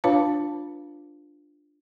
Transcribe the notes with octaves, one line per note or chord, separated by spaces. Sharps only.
D4 F4 B4 C#5 F5 A5